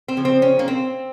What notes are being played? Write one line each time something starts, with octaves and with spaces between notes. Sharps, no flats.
C4
C#3 F3
C4
C#4
A#3
C4